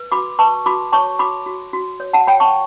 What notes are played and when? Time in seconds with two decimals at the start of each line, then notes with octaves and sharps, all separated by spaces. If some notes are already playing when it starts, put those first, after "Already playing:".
Already playing: B4
0.12 F#4 B5 D6
0.39 B4 A5 C#6
0.66 F#4 B5 D6
0.92 C#5 A5 C#6
1.19 F#4 B5 D6
1.46 F#4
1.73 F#4
2.00 C#5
2.13 F#5 A5
2.27 C#5 G5 B5
2.40 A5 C#6